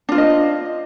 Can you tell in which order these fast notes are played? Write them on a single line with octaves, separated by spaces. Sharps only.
D4 F4 C5 D#5